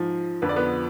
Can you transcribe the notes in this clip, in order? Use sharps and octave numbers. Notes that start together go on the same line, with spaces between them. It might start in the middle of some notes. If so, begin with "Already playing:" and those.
Already playing: G#2 F3
F2 D3 F3 B4
D5
B3 B4